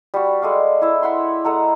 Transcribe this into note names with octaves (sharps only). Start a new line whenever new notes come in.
G3 F#4
G#3 A4 D5 F5
E4 E5
E5 F#5 B5 C6
G#3 A4 F#5 A#5